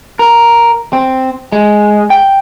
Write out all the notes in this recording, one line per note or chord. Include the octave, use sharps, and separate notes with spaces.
A#4
C4
G#3
G5